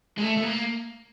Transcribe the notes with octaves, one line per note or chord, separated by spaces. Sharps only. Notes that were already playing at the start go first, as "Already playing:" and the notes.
G#3
A3
A3
A#3